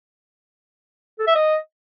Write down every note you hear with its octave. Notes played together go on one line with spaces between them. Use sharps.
A4
E5
D#5